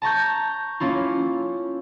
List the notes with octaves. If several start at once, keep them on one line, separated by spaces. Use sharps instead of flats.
A5 A#5 C#6 G6
A#3 C#4 E4 F4